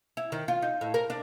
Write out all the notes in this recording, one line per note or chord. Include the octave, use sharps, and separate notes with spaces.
E4
D#3
F4
D#4
A2
A#4
D4